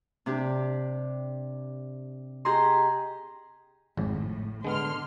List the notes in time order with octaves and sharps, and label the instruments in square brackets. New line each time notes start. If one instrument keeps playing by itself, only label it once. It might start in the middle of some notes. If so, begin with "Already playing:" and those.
[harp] C3 D4 G4
G4 G#4 D#5 A#5 C6
[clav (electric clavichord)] G#1 F2 C#3 [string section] A2
[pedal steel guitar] D3 [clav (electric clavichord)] G#3 B3 [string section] C6 F6